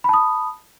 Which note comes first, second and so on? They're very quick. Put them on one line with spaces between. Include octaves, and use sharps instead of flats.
B5 A5 D#6